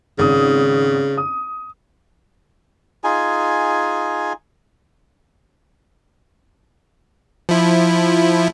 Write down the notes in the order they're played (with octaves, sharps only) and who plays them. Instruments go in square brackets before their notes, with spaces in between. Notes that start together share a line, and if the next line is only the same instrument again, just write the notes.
[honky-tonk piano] G#1 D#6 [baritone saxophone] C#3
[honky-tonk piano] D#6
[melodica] D#4 F4 G#4 G#5
[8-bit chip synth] F3 E4